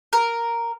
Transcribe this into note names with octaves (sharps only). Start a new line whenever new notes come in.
A#4